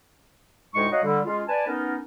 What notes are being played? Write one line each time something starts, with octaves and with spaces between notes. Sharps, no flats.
D2 A2 G#3 D#4 C#6
D#4 F#4 C#5 D#5 F5 F#5
D3 G3
G#3 C#4 F4
B4 D5 G#5 A5
B3 C#4 D#4 A#4